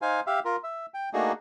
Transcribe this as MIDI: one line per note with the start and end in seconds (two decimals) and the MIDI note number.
0.02 0.20 63
0.02 0.20 72
0.02 0.20 77
0.02 0.20 80
0.27 0.40 67
0.27 0.40 76
0.27 0.40 77
0.45 0.56 65
0.45 0.56 70
0.64 0.86 76
0.94 1.09 79
1.13 1.32 57
1.13 1.32 58
1.13 1.32 62
1.13 1.32 63
1.13 1.32 66
1.13 1.32 68